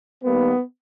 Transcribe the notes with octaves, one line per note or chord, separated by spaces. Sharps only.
D#3 G3 A#3 B3